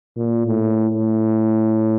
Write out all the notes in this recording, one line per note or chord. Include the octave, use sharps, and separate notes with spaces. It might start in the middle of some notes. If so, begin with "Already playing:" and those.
A#2
A2
A2